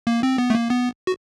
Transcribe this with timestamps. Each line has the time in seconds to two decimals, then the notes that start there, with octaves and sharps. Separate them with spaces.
0.07 A#3
0.23 C4
0.38 B3
0.50 A3
0.55 A#3
0.70 B3
1.07 F#4